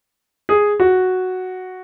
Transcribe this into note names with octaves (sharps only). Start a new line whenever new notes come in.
G#4
F#4